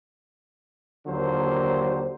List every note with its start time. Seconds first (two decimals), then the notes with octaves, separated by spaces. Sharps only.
1.07 D#2 D3 F#3 A#3 F4 C5